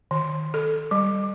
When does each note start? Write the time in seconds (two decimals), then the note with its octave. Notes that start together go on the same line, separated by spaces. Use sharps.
0.11 D#3
0.54 A4
0.91 G3